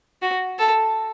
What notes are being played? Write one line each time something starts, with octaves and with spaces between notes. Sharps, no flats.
F#4
A4